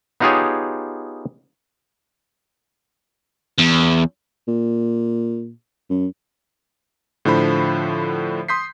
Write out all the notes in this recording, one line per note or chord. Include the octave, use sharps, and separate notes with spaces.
B3 D#4 F4 G4 G#4 C#5
E2
A#2
F#2
A2 D3 F3 C5 B5
C6 D#6 G6 B6 C7